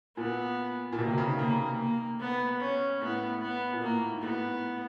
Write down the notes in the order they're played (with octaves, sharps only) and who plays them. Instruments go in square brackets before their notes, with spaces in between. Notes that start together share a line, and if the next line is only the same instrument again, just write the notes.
[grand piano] A#2 [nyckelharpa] B3
[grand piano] A#2
[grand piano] B2 [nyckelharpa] A#3
[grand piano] C3
C#3
D#3
[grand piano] C#3 [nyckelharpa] A#3
[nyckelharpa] A#3
B3
C#4
[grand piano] A2 [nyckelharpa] B3
[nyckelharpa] B3
[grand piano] A#2
[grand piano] A2 [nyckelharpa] A#3
[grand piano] G#2
[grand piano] A2 [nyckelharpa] B3